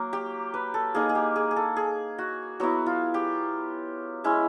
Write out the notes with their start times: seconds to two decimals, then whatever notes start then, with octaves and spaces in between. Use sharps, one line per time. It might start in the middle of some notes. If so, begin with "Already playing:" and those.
Already playing: F#3 A#3
0.13 G4
0.54 B4
0.74 A4
0.94 A#3 D#4 G#4
1.09 G#4
1.15 G4
1.36 G#4
1.51 G#4
1.56 A4
1.77 G#4
2.18 F#4
2.60 F#3 B3 E4 F#4
2.86 F4
3.14 G4
4.24 G#3 C#4 E4